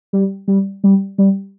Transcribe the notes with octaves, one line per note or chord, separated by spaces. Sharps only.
G3
G3
G3
G3